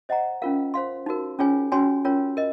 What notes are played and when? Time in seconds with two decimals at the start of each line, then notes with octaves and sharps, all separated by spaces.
0.09 C5 D#5 F#5 A#5
0.42 C#4 F4 A#4 F5
0.74 C5 F5 C6
1.06 D#4 F#4 A#4
1.39 C#4 F4 G#4 C#5 G#5
1.72 C#4 F#4 C#5 G#5 C6
2.05 C#4 F4 A#4 C#5
2.37 A#4 D#5